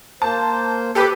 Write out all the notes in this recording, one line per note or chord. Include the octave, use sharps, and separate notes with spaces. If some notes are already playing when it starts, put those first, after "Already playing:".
A#3 C5 A5
G4 A4 B4 D6